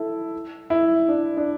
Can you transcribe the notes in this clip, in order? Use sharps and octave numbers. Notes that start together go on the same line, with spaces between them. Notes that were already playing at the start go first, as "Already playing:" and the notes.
Already playing: E4 A4
E4
D4
D4